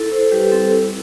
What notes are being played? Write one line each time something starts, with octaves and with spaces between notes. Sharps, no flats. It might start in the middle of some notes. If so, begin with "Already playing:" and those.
Already playing: E4 A4
E4 A4 C5
G3 G4 B4
C4 A4
E4